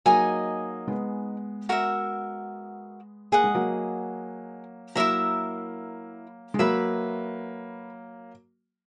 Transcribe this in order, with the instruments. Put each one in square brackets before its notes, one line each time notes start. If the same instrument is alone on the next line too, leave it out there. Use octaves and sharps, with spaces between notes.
[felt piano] F#3 A#3 [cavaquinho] D#4 G#4 D#5 G#5
[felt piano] G#3 B3
[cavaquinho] F#4 A#4 E5
[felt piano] A#3 [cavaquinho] G#4 D#5 F#5
[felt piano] G#3
F#3 A#3
[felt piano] F#3 A#3 [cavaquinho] E4 A#4 E5 A#5
[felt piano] G#3
[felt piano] F#3 A#3 [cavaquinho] B4 E5 B5